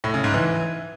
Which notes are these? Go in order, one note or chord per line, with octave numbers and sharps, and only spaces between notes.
A2
C#3
G#2
E3